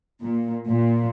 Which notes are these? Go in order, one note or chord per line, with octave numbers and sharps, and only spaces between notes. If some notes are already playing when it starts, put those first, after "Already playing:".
A#2
A#2